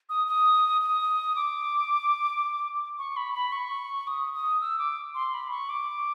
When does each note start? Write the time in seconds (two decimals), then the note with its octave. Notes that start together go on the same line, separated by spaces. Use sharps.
0.09 D#6
0.27 D#6
0.81 D#6
1.36 D6
2.98 C#6
3.17 B5
3.34 B5
3.52 C#6
4.07 D#6
4.34 D#6
4.61 E6
4.79 D6
5.15 C6
5.34 B5
5.51 C#6
5.69 D6